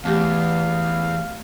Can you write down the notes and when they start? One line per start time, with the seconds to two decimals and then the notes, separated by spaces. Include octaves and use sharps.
0.05 E2 A3 G4 F5